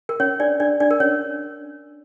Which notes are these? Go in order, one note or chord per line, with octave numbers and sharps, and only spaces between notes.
A#4
C#4 C#5
D4 D5
D4 D5
D4 D5
A#4
C#4 C#5